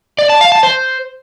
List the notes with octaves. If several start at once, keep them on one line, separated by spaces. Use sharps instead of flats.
D5
A5
F5
A5
C5